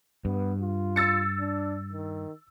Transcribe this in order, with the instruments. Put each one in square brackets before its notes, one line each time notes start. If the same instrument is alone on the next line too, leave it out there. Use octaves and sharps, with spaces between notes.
[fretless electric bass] G2 [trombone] B3
[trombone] F4
[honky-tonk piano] E6 A6 C#7
[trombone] D4
D#3